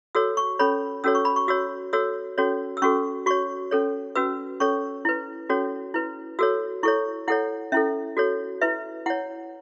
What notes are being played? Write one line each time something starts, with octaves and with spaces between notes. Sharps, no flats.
F#4 A4 C#5 E6
C#6
C#4 A4 C#5 B5
C#4 F#4 A4 C#5 E6
C#6
B5
C#6
F#4 C#5 E6
F#4 A4 C#5 E6
C#4 F#4 A4 C#5
E6
C#4 F#4 A4 C#6
F#4 C#5 C#6
C#4 A4 C#5
C#4 F#4 B4 E6
C#4 A4 C#5 C#6
E4 B4
C#4 F#4 A4 C#5
E4 B4
F#4 A4 C#5 E6
E4 A4 C#5 C#6
E4 A4 C#5 F#5
C#4 E4 A4 E5
F#4 A4 C#5
E4 B4 E5
E4 C#5 F#5